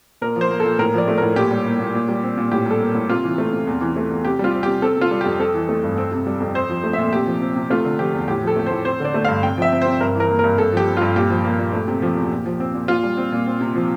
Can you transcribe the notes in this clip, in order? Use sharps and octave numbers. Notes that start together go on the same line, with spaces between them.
A#2 A#4
F3 C5
A#3
A4
A#2
A2 A#4
F3 D5
A3
A2 A#4
A#2 G4
G3
A#3
A#2
A#2
G3
C4
A#2
A2 G4
G3 A4
A#3
A2
C3 F4
E3
A3
C3
E2
E3
A3
E2
C3 G4
G3 F4
C4
C3 G4
C4 A4
C3 F4
G3
F2 G4
C4 A4
E3
A3
G2
C4
C3
G3
F2
C4 C5
F3
A3
A#2 E5
C3 G4
F3
C4
C3
A3 F4
D3
F3 G4
E2
A2 G4
F3 A4
A3
A2 C5
C4 C5
D3 D5
A3
G2 F5
C3 G5
F3 E5
C4
C3 C5
G2 A#4
E3 A#4
A#3
A#4
G2
G2 A4
F3 G4
C4
G2 F4
A#2 G4
F3
A#3
A#2
A3
C3
F3
E2
A#2
F3
C4
A#2
A#2 F4
G3
C4
A#2
C4
C3
F3